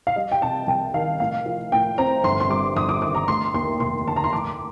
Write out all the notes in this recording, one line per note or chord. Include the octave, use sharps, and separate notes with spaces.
F5
G3 D#5
G5
C3 A5
C2 G5
D#3 F5
A2 F5
F3
A2 G5
C4 A#5
G1 C6
C6
G2 D6
G1 D#6
D6
D#3 D6
A#5
A3 C6
D#2 C6
F1 C6
D3 A5
A#5
C6
A2 D6